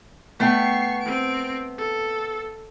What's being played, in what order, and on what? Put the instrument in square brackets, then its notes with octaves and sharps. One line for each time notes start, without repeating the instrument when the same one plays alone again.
[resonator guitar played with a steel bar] A3 B3 G5 [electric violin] C#6 C7
[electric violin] C4 D7
A4